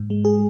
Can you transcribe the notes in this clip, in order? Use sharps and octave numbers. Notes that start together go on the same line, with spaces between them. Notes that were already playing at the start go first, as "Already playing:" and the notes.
Already playing: G#2
G#3
G#4